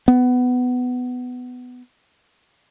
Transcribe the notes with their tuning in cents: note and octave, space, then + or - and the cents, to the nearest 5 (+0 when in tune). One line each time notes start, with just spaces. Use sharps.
B3 +15